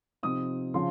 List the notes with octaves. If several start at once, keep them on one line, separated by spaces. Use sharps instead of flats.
C3 F3 C4 D#4 D#6
C#3 F3 C6